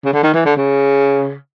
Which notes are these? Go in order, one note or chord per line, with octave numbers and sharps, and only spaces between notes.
C#3
D3
D#3
E3
D3
C#3